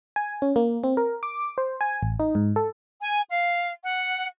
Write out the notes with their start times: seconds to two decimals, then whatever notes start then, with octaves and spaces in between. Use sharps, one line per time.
0.16 G#5
0.42 C#4
0.56 A#3
0.84 C4
0.97 A#4
1.23 D6
1.58 C5
1.81 G#5
2.03 A1
2.20 D#4
2.35 G#2
2.56 A4
3.01 G#5
3.30 F5
3.83 F#5